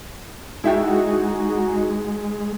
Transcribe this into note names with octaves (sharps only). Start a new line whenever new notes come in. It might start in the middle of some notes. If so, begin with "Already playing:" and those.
G#3 D#4 E4 F#4 G#4 E5 G5